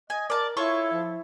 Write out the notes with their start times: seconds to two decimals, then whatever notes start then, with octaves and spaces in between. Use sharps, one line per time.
0.10 D#5 G#5
0.30 A#4 D5 A5
0.57 E4 F4 A4 C#5 C#6
0.92 F3